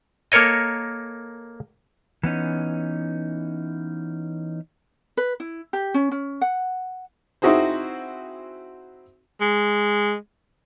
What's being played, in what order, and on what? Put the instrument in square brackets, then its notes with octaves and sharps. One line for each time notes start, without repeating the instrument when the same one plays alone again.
[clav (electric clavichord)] A#3 A4 A#4 C#5 D#5
[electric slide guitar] E3 B3 C#4 D#4
[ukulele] B4
E4
G4
C#4
C#4
F#5
[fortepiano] C4 D#4 E4 F#4 G#4 C5
[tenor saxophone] G#3